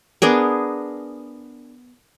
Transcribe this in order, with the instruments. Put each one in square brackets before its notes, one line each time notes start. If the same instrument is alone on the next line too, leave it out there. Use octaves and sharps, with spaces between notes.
[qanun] B3 D4 G#4 A#4